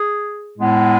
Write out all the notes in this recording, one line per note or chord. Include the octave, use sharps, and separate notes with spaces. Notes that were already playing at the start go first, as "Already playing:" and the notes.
Already playing: G#4
A2 G#3 B3